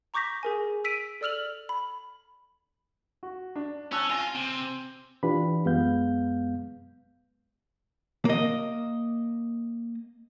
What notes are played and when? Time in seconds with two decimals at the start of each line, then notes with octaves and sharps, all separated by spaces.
0.14 A#5 C#6 D6 G6 A#6 B6
0.43 G#4 A#4 G#5
0.84 E6 B6 D7 D#7
1.21 A4 D5 E6 F6 F7 F#7
1.69 B5
3.23 F#4
3.56 D4
3.92 C#4 A5 E6 F#6
4.10 F4 G#5 A#6 D#7
4.36 C3
5.23 E3 D4 F4 G4 B4 B5
5.65 F#2 G#3 B3 F5 G6
8.25 A#3 D#5